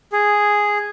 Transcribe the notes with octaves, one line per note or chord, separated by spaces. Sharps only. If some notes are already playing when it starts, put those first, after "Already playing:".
G#4